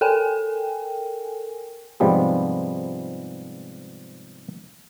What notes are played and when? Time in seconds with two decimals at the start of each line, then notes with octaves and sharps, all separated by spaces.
0.01 A4 A#4 G5 G#5
2.00 G#2 C3 F3 G3 G#3 B3